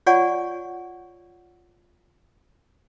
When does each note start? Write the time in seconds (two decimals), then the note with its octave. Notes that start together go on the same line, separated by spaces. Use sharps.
0.06 F4 C#5 D5 F#5 G#5 C#6